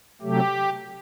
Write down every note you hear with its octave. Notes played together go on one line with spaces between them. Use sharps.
C3 F#3 A3 G4